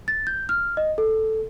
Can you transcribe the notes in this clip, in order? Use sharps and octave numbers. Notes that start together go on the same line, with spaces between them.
A6
G6
F6
D#5
A4